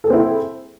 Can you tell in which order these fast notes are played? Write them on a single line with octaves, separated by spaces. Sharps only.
A4 G#4 C4 E4